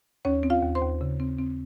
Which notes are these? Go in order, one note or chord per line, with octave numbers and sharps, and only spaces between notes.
D#2 C#4 C#5
C4
F4 F5
D#2
C5 C6
D#2
C#3
C4
C4